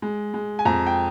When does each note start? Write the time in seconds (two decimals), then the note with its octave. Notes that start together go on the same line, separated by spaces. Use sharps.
0.02 G#3
0.34 G#3
0.59 G#5
0.65 F2 A#5
0.87 G5